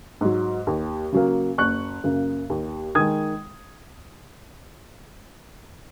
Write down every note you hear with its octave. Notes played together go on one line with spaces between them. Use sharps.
G#2 F#3
D#2
C#3 F#3 A#3
F#1 C#6 F#6
F#2 C#3 A#3
D#2
D#3 G#3 D#6 G#6